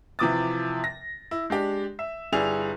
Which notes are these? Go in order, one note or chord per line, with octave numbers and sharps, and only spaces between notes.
C3 E3 F3 D6 D#6 A6
A#6
E4
G#3 D4 G4
E5
G1 G3 E4 G#4 F7